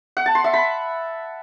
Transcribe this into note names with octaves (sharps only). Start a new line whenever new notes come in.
F#5
A5
C6
E5
B5